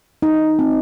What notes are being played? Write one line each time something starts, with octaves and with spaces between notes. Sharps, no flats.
D#4
C4